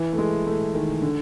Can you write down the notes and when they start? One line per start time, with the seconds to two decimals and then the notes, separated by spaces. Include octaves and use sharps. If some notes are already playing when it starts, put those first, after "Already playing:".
Already playing: E3
0.13 A3
0.18 G#3
0.47 A3
0.74 D#3
1.02 D3